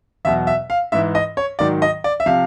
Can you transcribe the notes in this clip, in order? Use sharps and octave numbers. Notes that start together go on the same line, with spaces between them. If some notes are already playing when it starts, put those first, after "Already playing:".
E2 B2 F#3 E5
E5
F5
G#2 E3 E5
D#5
C#5
G#2 D#3 F#3 D5
D#5
D5
E5
C3 F3 F5